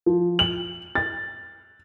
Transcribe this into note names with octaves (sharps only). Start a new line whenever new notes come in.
F3
F#7
A6